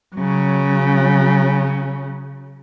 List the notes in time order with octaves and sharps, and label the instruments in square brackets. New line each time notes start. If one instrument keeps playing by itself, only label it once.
[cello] C#3 F#3